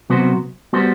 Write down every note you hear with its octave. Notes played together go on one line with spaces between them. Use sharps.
C3 F#3 B3 F#4 C5
G3 B3 F#4 C5